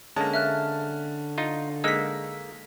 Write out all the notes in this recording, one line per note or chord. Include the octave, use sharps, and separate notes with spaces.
D3 G#3 A#3 C#4 A5
E5 F6 F#6
D#4 F4
G#3 A#3 D#4 E6 B6